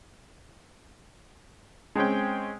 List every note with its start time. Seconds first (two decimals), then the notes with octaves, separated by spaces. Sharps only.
1.95 G#3 C4 C#4 G5